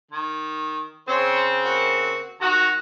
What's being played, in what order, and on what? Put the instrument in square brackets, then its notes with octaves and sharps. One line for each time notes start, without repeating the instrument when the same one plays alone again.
[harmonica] D#3
[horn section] C#3 C4 [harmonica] C5 C#5
[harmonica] A#3 F#4
[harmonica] D#3 A#5 [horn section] F#4